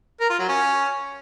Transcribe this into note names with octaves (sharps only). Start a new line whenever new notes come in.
A#4
F4
F#3
C#4